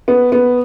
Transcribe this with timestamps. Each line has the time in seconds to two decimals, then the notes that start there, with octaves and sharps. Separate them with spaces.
0.08 B3
0.32 B3